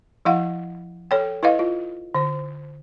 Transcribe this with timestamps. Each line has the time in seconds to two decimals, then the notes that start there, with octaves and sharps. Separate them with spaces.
0.25 F3 E4 F5 F#5
1.11 A4 C#5 G5
1.43 E4 B4 D#5 F5
1.59 F4
2.15 D3 C5